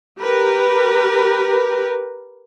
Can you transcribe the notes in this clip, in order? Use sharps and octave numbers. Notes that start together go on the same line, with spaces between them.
G4 A#4 B4